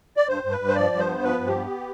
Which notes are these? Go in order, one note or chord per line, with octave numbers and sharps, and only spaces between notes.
D5
G2 C5
G2
B4
G2
C5
F3 D5
G2
C5
B3
F3 B4
G2
G4
B3